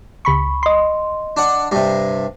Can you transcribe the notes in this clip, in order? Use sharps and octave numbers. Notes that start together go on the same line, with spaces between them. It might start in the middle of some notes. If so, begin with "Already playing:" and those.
C#2 B5 C#6
D#5 C6
D4 F#5
G2 C3